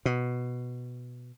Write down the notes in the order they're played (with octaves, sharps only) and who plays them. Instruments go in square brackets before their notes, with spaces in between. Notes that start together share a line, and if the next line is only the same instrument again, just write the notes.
[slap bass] B2